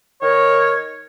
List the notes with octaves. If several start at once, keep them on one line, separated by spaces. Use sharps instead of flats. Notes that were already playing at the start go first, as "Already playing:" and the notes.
D#3 A#4 C#5